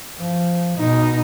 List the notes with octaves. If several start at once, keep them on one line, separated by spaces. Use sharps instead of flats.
F3
B2 D#4